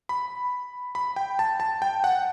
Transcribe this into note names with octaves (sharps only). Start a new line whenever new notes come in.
B5
B5
G5
A5
A5
G5
F#5